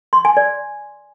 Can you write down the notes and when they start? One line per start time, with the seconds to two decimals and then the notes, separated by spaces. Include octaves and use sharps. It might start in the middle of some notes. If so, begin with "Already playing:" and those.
0.13 C6
0.25 G#5
0.37 D5